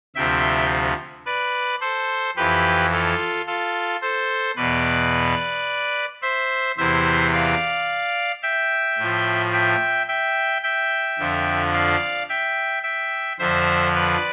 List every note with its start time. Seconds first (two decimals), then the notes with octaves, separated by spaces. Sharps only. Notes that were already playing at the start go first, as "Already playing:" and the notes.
0.15 D2 C3 F3 E5 G5
1.26 B4 D5
1.81 A4 C5
2.37 F2 E3 G4 B4
2.92 F4 A4
3.47 F4 A4
4.01 A4 C5
4.56 E2 B2 B4 D5
6.22 C5 E5
6.77 E2 C3 E3 C5 E5
7.32 D5 F5
8.43 E5 G5
8.98 A2 F3
9.53 E5 G5
10.08 E5 G5
10.63 E5 G5
11.19 F2 D3 F3
11.74 D5 F5
12.29 E5 G5
12.84 E5 G5
13.39 F2 D3 F3 C5 E5
13.95 B4 D5